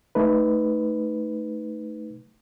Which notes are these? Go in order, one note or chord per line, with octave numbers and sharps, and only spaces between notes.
A3 D#4 B4